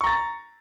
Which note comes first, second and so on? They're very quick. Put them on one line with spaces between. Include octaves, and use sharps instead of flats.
C#6 A#5 A6